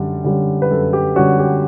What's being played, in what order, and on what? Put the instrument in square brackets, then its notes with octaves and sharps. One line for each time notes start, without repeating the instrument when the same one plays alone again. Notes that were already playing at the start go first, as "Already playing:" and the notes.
Already playing: [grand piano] F#2 D3 G3
D3 G3 C#4
B4
F#2 A4
G4
D3 G3 C#4 F#4
G4